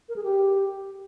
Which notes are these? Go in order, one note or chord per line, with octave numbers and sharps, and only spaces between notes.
A#4
G#4
G4